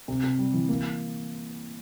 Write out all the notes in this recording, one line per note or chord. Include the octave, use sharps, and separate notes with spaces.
C3
C3
G3
E3
A#3